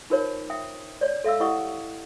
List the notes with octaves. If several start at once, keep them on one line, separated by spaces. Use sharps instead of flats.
D#4 F4 A#4 C5 C#5
E5 G5 D#6
C#5 D5
A4 E5 F5 E6
E4 G4 D#5 F#5 C#6 D#6